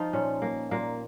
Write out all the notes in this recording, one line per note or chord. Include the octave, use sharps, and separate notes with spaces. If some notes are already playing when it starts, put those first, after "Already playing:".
Already playing: F3 D#4 F4
A#2 C#4
A#3
A#2 A#3